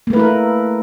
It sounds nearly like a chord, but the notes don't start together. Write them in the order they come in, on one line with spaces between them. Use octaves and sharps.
A#3 A3 B4 E4 A#4